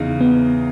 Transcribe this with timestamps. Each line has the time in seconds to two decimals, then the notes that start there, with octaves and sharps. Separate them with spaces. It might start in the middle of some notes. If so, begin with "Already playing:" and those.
Already playing: E2 C#3 D#4
0.21 B3